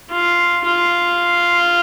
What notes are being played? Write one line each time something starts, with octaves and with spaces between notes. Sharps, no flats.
F4
F4